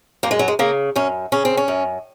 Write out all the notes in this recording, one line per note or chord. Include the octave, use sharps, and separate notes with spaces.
F#2 A#3
G#3
F#3
G#3
C#3 A#3
F#2 C#4
C#3 C#4
C4
C#4
F#2